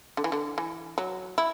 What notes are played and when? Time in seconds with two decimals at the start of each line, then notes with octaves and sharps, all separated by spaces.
0.17 D3
0.24 E3
0.32 D3
0.58 E3
0.98 F#3
1.38 E4